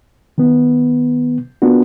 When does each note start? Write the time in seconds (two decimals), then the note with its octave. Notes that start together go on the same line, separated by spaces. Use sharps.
0.38 D#3 B3
1.62 A#3 B3 D4 F4 F#4